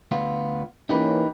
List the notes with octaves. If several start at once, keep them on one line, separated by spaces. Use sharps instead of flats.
D2 B3 F4
E3 A#3 C#4 D#4 G4 B4